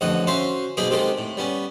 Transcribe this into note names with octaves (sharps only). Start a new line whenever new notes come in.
A1 F2 D3 D#4 F#5 D#6
C#4 F#4 C5 E5 F5 C6
B1 A#3 G#4 C5 D#5 B5
C3 D#3 G#3 C4 A4
A2
G3 B3 C#4